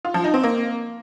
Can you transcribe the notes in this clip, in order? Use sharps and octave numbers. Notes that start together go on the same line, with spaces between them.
F4
F3
D#4
C4
A#3